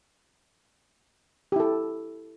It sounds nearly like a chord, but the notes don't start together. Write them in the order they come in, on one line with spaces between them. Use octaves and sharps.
G4 E4 A4